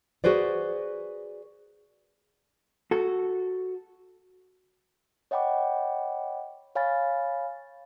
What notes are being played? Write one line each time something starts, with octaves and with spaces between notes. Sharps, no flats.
F#4 G#4 B4 C5 D5
F#4 A4
C#5 D#5 F#5 G5 B5 D6
C#5 F5 G#5 B5 F6 A6